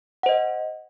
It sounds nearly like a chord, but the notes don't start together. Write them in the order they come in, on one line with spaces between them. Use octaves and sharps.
F#5 C5 D#5